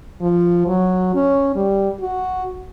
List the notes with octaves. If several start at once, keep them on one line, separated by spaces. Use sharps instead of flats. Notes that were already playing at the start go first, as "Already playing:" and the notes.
F3
F#3
C#4
G3
F#4